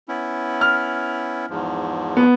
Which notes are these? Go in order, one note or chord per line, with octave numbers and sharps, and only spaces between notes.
B3 C#4 E4
F6
E2 G#2 F3
B3